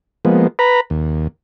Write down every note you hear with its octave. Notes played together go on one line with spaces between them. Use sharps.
F3 G#3 A#3 B3
B4 A#5 B5
D#2